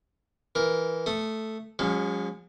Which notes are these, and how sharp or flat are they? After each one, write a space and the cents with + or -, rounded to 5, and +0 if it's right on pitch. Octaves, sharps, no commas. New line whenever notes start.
E3 +0 A#4 +5
A3 +0 D#6 -15
F3 +45 G#3 -35 C#4 +5